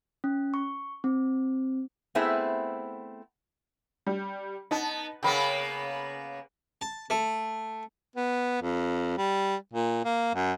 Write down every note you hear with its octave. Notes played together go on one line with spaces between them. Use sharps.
C#4
C#6
C4
A3 B3 C4 E4 G#4 E5
G3
B3 D#4 A5
C#3 A#3 B3 G5 B5
A5
A3
B3
F2
G3
A#2
A#3
F#2